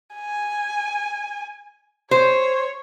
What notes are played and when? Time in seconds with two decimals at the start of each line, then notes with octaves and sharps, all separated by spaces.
0.15 G#5
2.11 C5 C#5